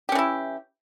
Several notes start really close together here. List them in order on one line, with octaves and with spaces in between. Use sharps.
G4 C#4 E3 E4